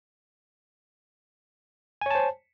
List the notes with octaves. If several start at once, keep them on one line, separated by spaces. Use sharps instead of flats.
C5 C#5 G#5 A5